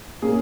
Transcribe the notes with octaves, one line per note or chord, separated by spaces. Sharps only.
A#2 A#3 C#4 G#4